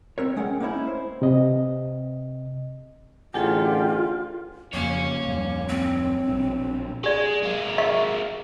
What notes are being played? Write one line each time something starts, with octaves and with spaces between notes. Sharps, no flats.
C4 A#4 C#5
G#3 C#4 F#5 G5
A#3 C#4 D#4 E4 C#5
C5
C3 D#5
A1 D3 F4 G4 G#4 F#5 G#5
F2 C#3 A#3 C#5 G#5
D1 F2 G3
C4
A#1 B2 D4
G#3 G4 D5
G#3 A#3
D#5 E5 C#6